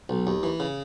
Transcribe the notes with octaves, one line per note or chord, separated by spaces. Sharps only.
B1
D#2
E3
C#3